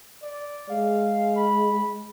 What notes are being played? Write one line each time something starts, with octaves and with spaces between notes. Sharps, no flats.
D5
G#3 F5
B5